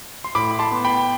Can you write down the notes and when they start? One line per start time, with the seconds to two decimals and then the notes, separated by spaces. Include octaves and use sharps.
0.24 C6
0.35 A2 B5 D6
0.51 B5
0.59 A5 C6
0.72 B3
0.84 G5 B5